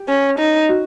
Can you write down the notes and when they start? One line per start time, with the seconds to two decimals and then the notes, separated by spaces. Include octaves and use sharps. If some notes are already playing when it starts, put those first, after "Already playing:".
Already playing: G4
0.08 C#4
0.38 D#4
0.69 F#4